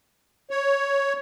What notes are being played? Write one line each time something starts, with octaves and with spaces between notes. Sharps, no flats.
C#5